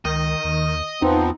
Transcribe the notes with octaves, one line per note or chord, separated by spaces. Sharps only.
C#2 D#3 D#5
D#2
E2 F3 B3 C4 D#4